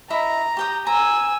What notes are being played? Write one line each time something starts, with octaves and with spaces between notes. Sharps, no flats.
E4 D#5 E5 A#5
G4 G5 D#6
G#5 A#5 E6